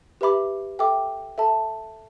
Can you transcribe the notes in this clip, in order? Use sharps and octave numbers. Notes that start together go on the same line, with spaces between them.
G4 B4 E5 B5 D6
A4 E5 G5 D6
A4 E5 A5